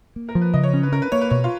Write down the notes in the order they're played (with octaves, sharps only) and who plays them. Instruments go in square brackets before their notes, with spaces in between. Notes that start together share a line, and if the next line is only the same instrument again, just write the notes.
[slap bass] A#3
[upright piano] A#4
[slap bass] F3
[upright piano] B4
[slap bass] C#3 [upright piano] D#5
[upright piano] C#5
[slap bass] C#4
[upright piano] B4
[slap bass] C#4 [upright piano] A#4
[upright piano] B4
[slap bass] A#3 [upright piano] C#5
[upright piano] B4
[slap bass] B2 [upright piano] C#5
[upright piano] F4